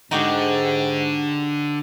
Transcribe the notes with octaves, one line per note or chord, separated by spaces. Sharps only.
G#2 D3 D#4 F#4 G4